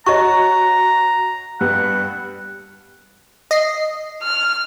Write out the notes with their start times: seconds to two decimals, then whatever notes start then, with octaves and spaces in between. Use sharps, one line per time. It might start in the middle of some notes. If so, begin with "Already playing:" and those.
0.06 F#4 C#5 D#5 A5 A#5 C#6
1.61 G2 G3 B3 F#5
3.51 D#5 C7
4.23 F6